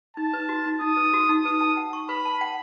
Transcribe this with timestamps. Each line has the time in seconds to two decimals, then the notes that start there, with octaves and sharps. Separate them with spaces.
0.17 D#4 A5
0.33 B4
0.49 F#4
0.66 D#4
0.81 D#4 D#6
0.97 B4
1.13 F#4
1.29 D#4
1.45 B4 D#6
1.61 A5
1.77 F#5
1.93 C#6
2.09 B4 B5
2.25 A5
2.41 F#5